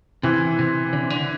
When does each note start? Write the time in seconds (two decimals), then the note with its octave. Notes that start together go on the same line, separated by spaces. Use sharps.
0.23 C3 E3
0.59 C3
0.93 D3
1.02 C3
1.10 D3